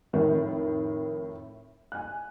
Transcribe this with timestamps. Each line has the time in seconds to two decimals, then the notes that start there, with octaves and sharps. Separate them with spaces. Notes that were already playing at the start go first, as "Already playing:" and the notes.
0.13 F2 A2 D#3
1.92 G#5 F#6